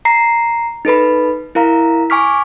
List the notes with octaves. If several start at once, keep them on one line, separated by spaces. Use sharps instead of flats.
A#5 C7
D#4 A4 B4 B5
E4 A#4 F5 A#5
G#5 C#6 D6 F6 B6